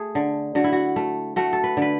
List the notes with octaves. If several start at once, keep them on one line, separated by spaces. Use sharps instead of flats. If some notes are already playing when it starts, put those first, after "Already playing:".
Already playing: A3 G#4
D3
D3 F#4
E4
F#4
A3
A3 F#4
A4
B4
D3 B4